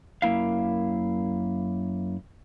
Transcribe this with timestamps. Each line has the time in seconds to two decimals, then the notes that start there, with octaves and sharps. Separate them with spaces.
0.22 F#2 A#3 E4 F5